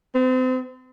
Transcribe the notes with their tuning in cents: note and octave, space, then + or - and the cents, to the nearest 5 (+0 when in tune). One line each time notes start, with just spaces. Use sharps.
C4 -35